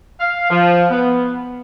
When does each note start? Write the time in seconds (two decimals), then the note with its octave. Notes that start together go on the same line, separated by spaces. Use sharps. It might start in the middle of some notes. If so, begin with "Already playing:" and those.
0.20 F5
0.50 F3
0.91 B3